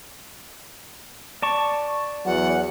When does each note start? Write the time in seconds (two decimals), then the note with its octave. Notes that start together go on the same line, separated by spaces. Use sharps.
1.42 D5 A5 C#6
2.26 E2 F#3 F#5